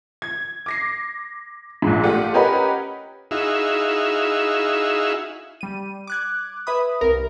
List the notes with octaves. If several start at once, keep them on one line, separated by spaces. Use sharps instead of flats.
G#6
D6 A#6 C7
A#1 G#2
A3 F4 G4 D5 F#5
C#4 G4 A#4 B4 D#5 F#5
D#4 E4 F#4 G#4 E5 F5
G3 D#7
D6 F#6 G#6
B4 E5 B5 D#6
C2 A#4